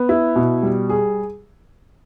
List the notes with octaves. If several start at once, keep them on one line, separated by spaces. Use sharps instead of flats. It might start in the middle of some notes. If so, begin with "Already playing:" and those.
Already playing: B3
E4
B2
G3
G#4